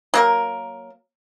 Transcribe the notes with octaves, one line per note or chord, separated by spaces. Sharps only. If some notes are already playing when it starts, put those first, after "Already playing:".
F#3 A#3 A#4